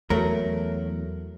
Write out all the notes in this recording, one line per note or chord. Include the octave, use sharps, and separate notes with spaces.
E2 F#3 A3 A#4